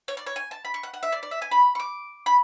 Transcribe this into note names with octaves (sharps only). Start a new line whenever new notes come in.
C#5
D5
C#5
G#5
A5
B5
C#6
F#5
F#5
E5
D5
D5
E5
G#5
B5
C#6
D6
B5